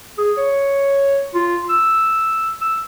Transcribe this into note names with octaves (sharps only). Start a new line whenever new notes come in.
G#4
C#5
F4
E6
E6